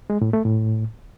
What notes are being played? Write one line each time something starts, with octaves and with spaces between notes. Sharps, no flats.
G#3
A2
A3
A2